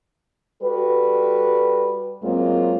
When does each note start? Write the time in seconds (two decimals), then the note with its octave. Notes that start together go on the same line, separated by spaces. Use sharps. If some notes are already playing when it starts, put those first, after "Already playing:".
0.62 G3 F#4 A4 B4
2.23 F#2 F#3 G#3 A#3 C4 F4